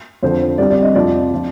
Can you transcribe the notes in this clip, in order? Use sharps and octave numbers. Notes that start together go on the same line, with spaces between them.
F2 D3 F3 C5
C2 C3 G3 D5
D5
D#5
F2 C3 F3 D5
F3